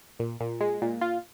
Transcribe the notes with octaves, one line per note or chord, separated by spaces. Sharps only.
A#2
A#2
G#3
A#2
F4